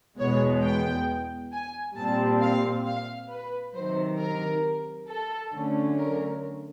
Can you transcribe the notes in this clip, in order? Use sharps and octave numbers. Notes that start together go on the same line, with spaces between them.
E2 B2 G#3 B3 C#5
G5
G#5
A#2 G3 C4 A5
F5
F5
B4
C3 D#3 F#3 C5
A#4
A4
D3 F#3 A3 C#4
A#4